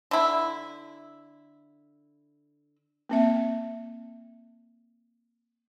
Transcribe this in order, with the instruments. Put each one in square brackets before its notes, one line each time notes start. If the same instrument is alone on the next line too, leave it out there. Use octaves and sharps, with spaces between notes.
[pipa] D3 E4
[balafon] A#3 C4 E5